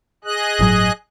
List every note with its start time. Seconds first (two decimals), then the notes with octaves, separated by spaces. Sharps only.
0.24 G#4 D#5 F#6
0.59 G1 A2 F#3